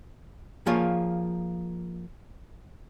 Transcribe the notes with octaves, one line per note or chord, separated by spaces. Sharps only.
F3 A#3 F4 G#4 C#5